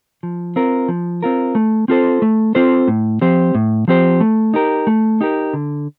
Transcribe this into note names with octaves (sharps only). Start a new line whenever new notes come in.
F3
C4 F4 A#4
F3
C4 F4 A#4
A3
C4 F4 A4 C5
A3
C4 F4 A4 C5
A2
F3 C4 G4 C5
A2
F3 C4 G4 C5
A3
D#4 G4 A#4
A3
D#4 G4 A#4
D3